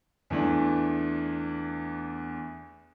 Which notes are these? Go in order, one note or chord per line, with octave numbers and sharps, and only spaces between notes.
E2 E3 A3 D4